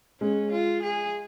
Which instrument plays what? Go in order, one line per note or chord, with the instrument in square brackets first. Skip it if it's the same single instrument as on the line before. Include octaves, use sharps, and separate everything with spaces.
[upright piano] G#3 [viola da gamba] C#4
[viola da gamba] F4
G#4